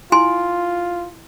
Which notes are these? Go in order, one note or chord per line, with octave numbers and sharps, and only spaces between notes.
E4 F4 G#5 C6